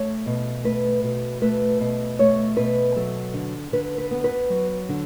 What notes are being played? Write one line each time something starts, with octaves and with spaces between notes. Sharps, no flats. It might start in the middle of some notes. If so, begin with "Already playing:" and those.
Already playing: A3 C#5
B2
A3 B4
B2
A3 B4
B2
A3 C#5
B2 B4
F#3 A4
D3
D3 B4
B4
B3
B4
F#3
D3